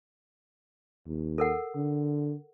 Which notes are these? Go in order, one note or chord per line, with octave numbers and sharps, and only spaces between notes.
D#2
A4 A#4 F#5
D3